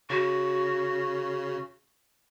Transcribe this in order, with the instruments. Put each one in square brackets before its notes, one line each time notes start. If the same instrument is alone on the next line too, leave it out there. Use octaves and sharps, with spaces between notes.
[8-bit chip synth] C#3 [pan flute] F#4